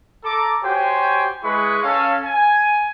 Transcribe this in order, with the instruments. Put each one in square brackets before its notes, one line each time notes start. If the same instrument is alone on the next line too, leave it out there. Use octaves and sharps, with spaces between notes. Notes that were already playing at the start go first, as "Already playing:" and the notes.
[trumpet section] A4 A#5 D6
F#4 G4 C5 C#5 G5 G#5
G#3 E4 G#4 B4 B5 C#6
C#4 A4 F5
G#5